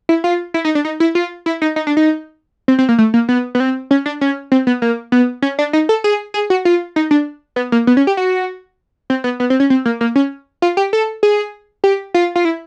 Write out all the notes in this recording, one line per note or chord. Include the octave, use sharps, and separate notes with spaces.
E4
F4
E4
D#4
D4
D#4
E4
F4
E4
D#4
D#4
D4
D#4
C4
C4
A#3
A3
A#3
B3
B3
C4
C#4
D4
C#4
C4
B3
A#3
B3
C#4
D4
D#4
A4
G#4
G#4
F#4
F4
D#4
D4
B3
A#3
B3
C#4
G4
F#4
C4
B3
B3
C4
C#4
C4
A#3
A#3
C#4
F4
G4
A4
G#4
G4
F4
F4
E4